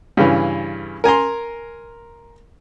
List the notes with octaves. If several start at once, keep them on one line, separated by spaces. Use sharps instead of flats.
G2 C#3 E3
A#4 G#5 A#5 C6